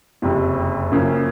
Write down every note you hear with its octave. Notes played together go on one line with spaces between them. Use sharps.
F#1 F2 C3
F#2 C#3 F3 A#3 C#4